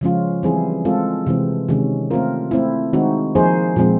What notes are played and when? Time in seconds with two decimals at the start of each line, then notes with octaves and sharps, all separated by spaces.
0.01 C#3 F3 G#3 C#4 F4
0.43 E3 G3 C4 E4 G#4
0.85 G#3 C4 F4 A4
1.27 C3 E3 G#3 C4
1.68 C3 D#3 G#3 C#4
2.11 A3 C4 F4 A#4
2.51 A3 C4 E4
2.93 D#3 G#3 C4 D#4 F#4
3.35 F3 A#3 D#4 G#4 C5
3.76 A#2 F3 G#3 C4